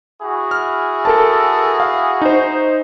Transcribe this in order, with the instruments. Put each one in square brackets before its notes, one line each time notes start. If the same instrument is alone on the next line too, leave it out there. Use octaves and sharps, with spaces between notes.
[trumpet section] E4 F#4 G#4
[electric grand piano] F6
A4 A#4 A5
F5
D#4 C5